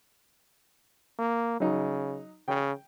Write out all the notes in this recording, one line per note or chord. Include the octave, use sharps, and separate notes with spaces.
A#3
C#3 F#3 D#4
C#3 G5